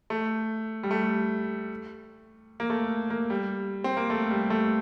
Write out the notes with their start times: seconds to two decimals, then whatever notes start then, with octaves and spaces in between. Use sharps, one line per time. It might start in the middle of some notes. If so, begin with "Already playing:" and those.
0.10 A3
0.83 G3
0.91 A3
2.60 A#3
2.70 A3
3.10 A#3
3.30 G3
3.84 C4
3.97 A#3
4.10 A3
4.31 G3
4.50 A3